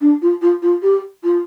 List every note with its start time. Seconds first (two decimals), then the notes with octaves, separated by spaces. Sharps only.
0.01 D4
0.22 F4
0.42 F4
0.62 F4
0.83 G4
1.23 F4